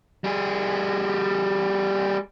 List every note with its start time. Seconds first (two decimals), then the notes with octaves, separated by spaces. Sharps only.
0.24 G3 G#4